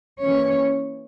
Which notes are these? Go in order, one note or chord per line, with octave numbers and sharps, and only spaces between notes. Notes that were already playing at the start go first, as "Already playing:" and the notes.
E3 A#3 C#4 C#5